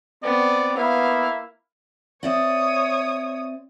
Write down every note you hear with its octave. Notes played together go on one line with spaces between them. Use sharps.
B3 C4 D5
A#3 B3 E4 F5
C4 C#5 D5 E5 D#6